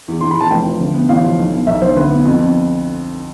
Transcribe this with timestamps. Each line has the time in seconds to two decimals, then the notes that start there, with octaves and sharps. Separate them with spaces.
0.08 E2
0.21 E2 C6
0.31 B5
0.36 E2 A5
0.51 F1 G5
0.66 F3
0.80 D2
0.94 B3
1.09 A1 F5
1.24 F3
1.38 B1
1.52 B3
1.67 B1 E5
1.82 B1 C5
1.96 D2 B4
2.11 B3
2.25 F2
2.40 F2